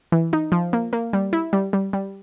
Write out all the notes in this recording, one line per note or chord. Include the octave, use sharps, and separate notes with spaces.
E3
D#4
F3
A#3
A#3
G3
E4
G3
G3
G3